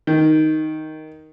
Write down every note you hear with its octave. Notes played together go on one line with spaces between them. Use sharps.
D#3